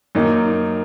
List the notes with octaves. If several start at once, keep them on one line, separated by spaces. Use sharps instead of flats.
F#2 D#3 A#3 D#4